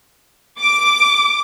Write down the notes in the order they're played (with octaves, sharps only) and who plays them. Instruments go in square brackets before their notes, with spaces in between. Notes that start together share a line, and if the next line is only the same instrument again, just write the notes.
[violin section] D6